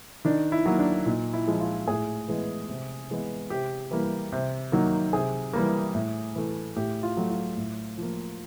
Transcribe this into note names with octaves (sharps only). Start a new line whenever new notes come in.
D#3 D4
E4
F#3 A#3
D4
A#2 D#4
E4
F3 G#3
F4
A2 G#4
E3 G#3 B3
C3
E3 G#3 B3
C3 G4
E3 G3 A#3
C3
D#3 F#3 A#3
C3 G#4
E3 G3 A#3
A2
E3 A3
A2 G4
F4
F#3 A3
F4
A2
F3 A#3